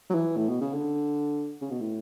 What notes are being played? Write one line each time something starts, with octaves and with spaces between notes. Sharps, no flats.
F#3
E3
A2
B2
C#3
D3
C#3
B2
A2